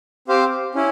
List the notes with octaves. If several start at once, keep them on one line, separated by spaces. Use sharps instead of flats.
C4 G4 C5 F5
C#4 E4